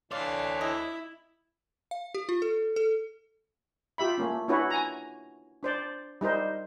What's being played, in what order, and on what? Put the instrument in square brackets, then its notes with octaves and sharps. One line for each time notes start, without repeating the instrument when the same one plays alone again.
[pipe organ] D2 E3 D4 [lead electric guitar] C#5 C6 [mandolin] D5 [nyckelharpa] F5
[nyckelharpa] E4 [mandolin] D#5
[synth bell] F5
G4
F4
A4
A4
[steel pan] F4 G4 E5 B5
A3 A#3 C#4
C#4 D4 E4 F#4 B4 C#5
G#5 A#5
D4 C5 D5
G3 D#4 A#4 C5